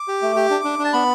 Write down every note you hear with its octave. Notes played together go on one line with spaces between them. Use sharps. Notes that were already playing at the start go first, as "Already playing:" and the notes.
Already playing: D6
G4
A3
G4
D4
D4
D4
A5
B3 B5